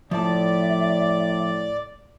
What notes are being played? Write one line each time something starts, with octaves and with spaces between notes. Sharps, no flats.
A2 F3 D5 E5 A5